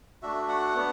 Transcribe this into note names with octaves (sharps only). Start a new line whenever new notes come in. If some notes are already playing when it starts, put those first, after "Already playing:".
A3 D4 F#4 E5
F#5
B3 D4